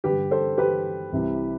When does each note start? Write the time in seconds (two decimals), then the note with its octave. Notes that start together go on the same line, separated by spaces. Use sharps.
0.04 G2 D3 G4 B4
0.31 A4 C5
0.58 G4 B4
1.12 C2 C3 E3